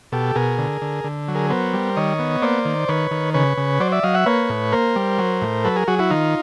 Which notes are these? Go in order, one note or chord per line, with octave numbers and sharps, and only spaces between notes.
B2 G4 A4
B2 G#4 A#4
D3
D3
D3
F#3
G#4 A#4
B3 A#4 C5
G3
D#3 C#5 D#5
B3
A#3 C5 D5
D#3
D#3 B4 C#5
D#3
C#3 B4 C#5
C#3
F#3 C5 D5
D5 E5
F#3 D#5 F5
E5 F#5
A#3 B4 C#5
A2
A#3 A#4 C5
G3
F#3
A2
F#3 A4 B4
G#4 A#4
F#3 F#4 G#4
E4 F#4
D#3 D#4 F4